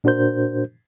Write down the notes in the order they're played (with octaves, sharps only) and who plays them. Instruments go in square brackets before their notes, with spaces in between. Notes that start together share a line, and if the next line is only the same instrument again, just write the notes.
[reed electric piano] A#2 D4 F#4 A#4 C5 G6